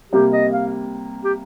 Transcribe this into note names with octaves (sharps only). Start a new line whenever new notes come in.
C3 G3 A#3 G4
D#5
F5
G4